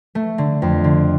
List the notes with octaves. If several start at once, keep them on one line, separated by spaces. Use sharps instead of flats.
A3
D3
F2
D3